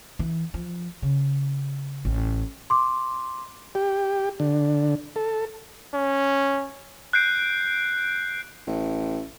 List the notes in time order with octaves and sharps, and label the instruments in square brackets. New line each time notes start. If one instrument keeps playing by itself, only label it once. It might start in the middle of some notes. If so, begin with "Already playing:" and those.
[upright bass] E3
F3
C#3
A1
[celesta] C6 D6
[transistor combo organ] G4
D3
A4
[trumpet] C#4
[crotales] F#6 G6 C7 D7
[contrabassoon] A1